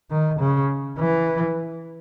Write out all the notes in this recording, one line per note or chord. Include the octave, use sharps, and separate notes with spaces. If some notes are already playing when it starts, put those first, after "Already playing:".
D#3
C#3
E3